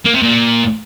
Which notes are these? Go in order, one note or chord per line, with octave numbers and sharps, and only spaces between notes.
A#3
C3
A#2